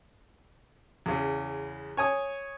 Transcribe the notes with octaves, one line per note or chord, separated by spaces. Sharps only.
E2 C#3
C#5 G#5 D#6